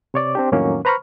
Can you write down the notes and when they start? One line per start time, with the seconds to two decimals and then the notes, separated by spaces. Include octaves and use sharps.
0.14 C3 C#5 D5 D6
0.35 C4 D4 G4
0.52 F2 A2 D#3 F#3 A#3 C#4
0.85 B4 C5 A#5 B5 C#6 F6